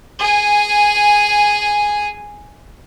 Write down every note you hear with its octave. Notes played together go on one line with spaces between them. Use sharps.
G#4 G#5